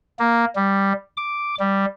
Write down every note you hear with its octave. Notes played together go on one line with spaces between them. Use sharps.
A#3
G3
D6
G3